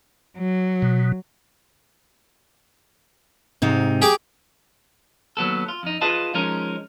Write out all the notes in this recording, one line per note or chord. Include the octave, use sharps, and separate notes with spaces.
F#3
B2
G#2 C3 D#4
G4 G#4 D6
D#2 F#3 B3 A4
F4
F2 D#4
F4 G#4 B4 D#5 F5 A5
F3 G#3 C#4 D#4 A#4